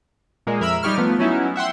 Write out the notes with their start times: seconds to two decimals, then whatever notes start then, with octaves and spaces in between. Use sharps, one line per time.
0.47 A#2 G#3 A#3
0.60 F2 A#4 E5 B5 E6
0.83 G3 D#4 G4 C#5 F6
0.98 F3 A3 B3
1.19 F#3 B3 C#4 D#4 E4
1.56 E5 F#5 G5 C6